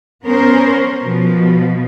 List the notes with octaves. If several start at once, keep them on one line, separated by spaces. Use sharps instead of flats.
B3 C#4 A#4 C5
B2 F3